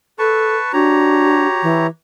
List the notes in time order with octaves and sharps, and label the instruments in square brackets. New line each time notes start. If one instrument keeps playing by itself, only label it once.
[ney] A4 [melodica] B4 A5 C#6
[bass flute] D4 [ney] F#4 [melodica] G4 C#5 A#5
[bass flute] E3